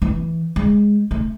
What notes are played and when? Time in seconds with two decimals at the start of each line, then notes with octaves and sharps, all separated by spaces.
0.02 E3
0.56 G#3
1.11 A3